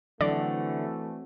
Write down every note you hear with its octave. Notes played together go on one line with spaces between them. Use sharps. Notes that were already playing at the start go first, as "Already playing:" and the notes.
D3 E3 F#3 A3 C4 D5